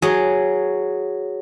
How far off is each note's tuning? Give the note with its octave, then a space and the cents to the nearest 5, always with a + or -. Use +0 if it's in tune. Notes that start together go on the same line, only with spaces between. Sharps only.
F#3 +0 G#4 +0